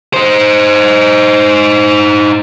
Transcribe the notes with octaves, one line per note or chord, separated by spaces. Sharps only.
D#4 C5